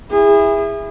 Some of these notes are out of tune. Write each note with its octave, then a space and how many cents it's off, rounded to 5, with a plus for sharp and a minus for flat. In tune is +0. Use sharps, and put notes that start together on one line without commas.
E4 +0 G#4 -30